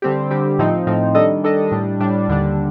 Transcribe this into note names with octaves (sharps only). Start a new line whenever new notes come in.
D3 G3 C4 G4
D3 G3 C4 G4
A2 F3 C4 D#4
A2 F3 C4 D#4
D#3 G3 D4 A4 D#5
D#3 G3 D4 A4 D#5
A2 G3 D4
A2 G3 D4
D#2 D3 G3 D4